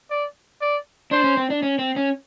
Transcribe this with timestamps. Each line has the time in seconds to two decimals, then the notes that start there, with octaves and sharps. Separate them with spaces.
0.10 D5
0.61 D5
1.11 D4 C5
1.24 C#4
1.37 C4
1.50 D4
1.63 C#4
1.79 C4
1.96 C#4